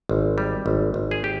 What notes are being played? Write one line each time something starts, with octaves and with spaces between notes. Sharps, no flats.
G#1
G3
G#1
G#1
G#4
G4